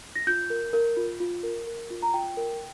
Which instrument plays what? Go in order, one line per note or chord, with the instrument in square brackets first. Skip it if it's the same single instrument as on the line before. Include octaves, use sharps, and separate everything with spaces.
[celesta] A#6
F4 G6
A#4
A#4
F4
F4
A#4
A#4
F4
A#5
F4 G5
A#4